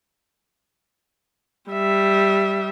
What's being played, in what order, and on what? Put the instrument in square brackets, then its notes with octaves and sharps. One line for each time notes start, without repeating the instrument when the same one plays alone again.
[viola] G3 E5